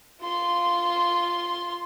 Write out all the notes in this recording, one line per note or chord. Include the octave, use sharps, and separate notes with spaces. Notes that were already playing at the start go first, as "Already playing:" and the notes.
F4 C6